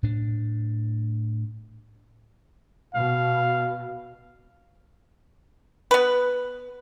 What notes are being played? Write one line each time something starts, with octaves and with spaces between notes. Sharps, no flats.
A2 D4
B2 F5
B3 B4